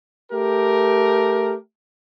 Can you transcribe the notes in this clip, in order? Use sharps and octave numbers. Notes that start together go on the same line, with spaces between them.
A3 G4 A#4